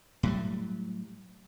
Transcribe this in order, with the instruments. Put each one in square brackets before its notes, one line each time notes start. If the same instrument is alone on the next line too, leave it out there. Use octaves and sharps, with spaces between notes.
[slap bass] A2 F#3 G3